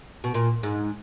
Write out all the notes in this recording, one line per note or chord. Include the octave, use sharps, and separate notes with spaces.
B2
A#2
G#2